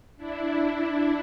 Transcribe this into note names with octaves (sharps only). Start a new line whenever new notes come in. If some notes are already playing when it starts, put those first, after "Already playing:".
D4 E4